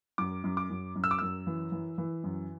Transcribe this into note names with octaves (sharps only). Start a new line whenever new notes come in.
F#2 D6
F#2
D6
F#2
F#2
E6
D6
F#2 E6
E3
E3
E3
F#2